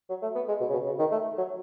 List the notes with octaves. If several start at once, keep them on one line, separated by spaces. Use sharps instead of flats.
F#3
A3
B3
G#3
B2
C#3
B2
C#3
D#3
A3
F#3